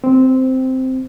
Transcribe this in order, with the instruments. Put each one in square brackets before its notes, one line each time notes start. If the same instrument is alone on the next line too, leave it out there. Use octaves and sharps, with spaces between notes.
[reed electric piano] C4